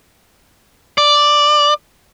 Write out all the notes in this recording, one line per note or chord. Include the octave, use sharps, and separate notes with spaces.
D5